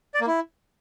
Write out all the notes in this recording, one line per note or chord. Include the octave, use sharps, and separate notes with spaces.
D5
A#3
E4